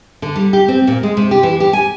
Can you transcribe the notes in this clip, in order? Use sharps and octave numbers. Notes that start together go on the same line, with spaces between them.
D3
G3
G4
C4
A#2
G#3
C3
G4
E3
G4
G#5